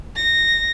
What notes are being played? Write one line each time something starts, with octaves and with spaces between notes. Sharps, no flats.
A#6